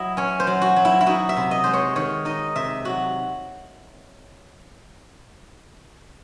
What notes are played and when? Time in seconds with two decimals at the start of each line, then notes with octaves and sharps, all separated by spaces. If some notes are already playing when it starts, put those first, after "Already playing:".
Already playing: F#3 E4 D#5
0.17 C#4 C#5
0.40 C5
0.47 F#3
0.62 F#4
0.76 F#3
0.85 E4
1.01 E4
1.06 D#4 F#4
1.29 E5
1.37 C3
1.51 D#5
1.64 G#3 C5
1.73 C#5
1.96 D#3 C#5
2.25 D#4 D#5
2.55 C3 E5
2.85 F#3 F#4